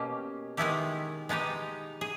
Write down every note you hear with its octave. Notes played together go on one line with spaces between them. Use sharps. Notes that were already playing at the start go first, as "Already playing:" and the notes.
Already playing: B2 A#3 C#4 G4
D#3 G#3 B3 E4 G4
G#3 B3 D#4 G4
G#4